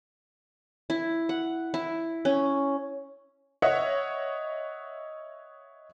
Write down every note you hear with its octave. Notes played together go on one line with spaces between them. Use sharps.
E4
F#5
E4
C#4
C#5 D#5 E5 F#5